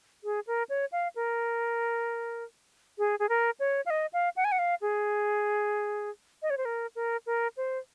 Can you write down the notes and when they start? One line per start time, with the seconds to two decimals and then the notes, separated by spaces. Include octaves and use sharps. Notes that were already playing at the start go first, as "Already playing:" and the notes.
0.24 G#4
0.47 A#4
0.69 C#5
0.92 F5
1.16 A#4
2.98 G#4
3.20 G#4
3.29 A#4
3.60 C#5
3.86 F5
3.90 D#5
4.13 F5
4.36 F#5
4.45 G#5
4.52 F#5
4.59 F5
4.82 G#4
6.42 D#5
6.50 C#5
6.58 C5
6.65 A#4
6.96 A#4
7.26 A#4
7.57 C5